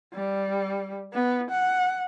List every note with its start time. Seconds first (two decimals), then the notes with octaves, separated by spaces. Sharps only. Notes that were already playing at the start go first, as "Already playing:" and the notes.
0.14 G3
1.13 B3
1.51 F#5